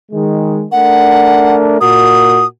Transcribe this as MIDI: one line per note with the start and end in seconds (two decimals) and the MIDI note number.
0.12 0.65 51
0.12 0.65 56
0.72 1.78 57
0.72 1.78 62
0.72 1.78 70
0.72 1.55 78
1.81 2.43 46
1.81 2.43 66
1.81 2.43 70
1.81 2.46 87